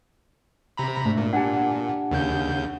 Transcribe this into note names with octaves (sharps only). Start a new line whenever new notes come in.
C3 A#5 B5
G#2 A3 D4
A#2
D4 G4 F#5 G#5
D#2 C#3 G6